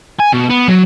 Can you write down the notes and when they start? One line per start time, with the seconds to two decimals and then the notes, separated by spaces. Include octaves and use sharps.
0.19 G#5
0.33 B2
0.50 B3
0.68 F#3